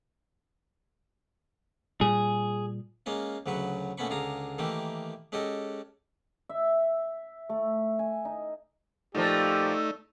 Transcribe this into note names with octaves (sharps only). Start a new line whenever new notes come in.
A#2 G3 G#4
G#3 A#3 C#4 F4
D2 C#3 F#3 B4 C#6
A#2 A3 B3 C#4 B5 C#6
C#2 D3 F4 G#4 A#5
D#3 E3 A3 A#3 G4
G#3 C#4 G4 A4 D#5
E5
A3
G#5
D#4
A#2 F3 A3 D#4 G4 D5 C#6 E6